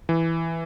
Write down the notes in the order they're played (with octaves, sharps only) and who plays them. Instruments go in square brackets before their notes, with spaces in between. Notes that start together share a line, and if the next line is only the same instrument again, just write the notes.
[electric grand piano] E3